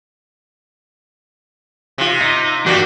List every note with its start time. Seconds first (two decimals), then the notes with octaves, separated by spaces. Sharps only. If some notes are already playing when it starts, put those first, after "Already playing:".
1.98 C3 F4
2.21 D#4
2.66 G3 A#3 D4 F#4 G4